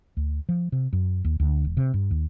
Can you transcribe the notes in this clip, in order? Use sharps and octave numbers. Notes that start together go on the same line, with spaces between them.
D2
F3
C3
F#2
D#2
D2
E1
C3
G2
D#2